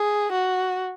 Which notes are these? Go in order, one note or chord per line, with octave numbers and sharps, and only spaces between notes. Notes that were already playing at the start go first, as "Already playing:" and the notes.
Already playing: G#4
F#4